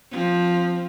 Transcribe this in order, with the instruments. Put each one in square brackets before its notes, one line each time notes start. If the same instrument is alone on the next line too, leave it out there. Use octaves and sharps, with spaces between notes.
[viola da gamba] F3 C4